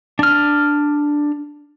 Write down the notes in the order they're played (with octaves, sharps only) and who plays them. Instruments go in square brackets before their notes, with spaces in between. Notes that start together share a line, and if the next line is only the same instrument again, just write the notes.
[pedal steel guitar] D4 F6